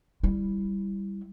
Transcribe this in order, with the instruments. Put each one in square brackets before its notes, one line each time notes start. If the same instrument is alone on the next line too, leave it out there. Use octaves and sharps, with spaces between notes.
[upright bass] G3 E4